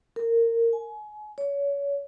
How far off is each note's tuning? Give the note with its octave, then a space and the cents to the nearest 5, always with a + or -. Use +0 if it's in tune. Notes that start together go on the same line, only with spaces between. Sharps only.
A#4 -20
G#5 +30
C#5 +30